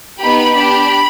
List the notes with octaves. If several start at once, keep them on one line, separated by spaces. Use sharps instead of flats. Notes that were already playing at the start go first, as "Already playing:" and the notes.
B3 D#4 G4 B5
D4 G4 B5